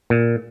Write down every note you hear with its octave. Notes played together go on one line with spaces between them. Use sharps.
A#2